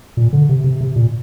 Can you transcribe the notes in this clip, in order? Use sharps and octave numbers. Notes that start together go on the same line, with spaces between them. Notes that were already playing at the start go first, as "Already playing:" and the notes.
A#2
D3
C3
C3
C3
A#2